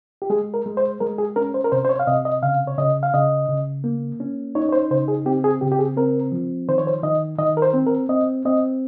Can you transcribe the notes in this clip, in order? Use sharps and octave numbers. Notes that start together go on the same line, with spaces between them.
G4
G#3 G#4
A#4
G#3
C5
G#3 A#4
G#4
C#4 A#4
C5
A#4
C3 C5
C5
C#5
F5
C3 D#5
D#5
C#3 F5
C#5
C#3 D#5
F5
C#3 D#5
C#3
A#3
C#4
D#4 C#5
C#5
C5
C#3 C5
G#4
C4 G4
G#4
C#3 G4
G4
G#4
C4 A#4
F3
D#3 C5
C#5
C5
D#3 D#5
D#3 D#5
A#4
C5
C4
A#4
C4 D#5
C4 D#5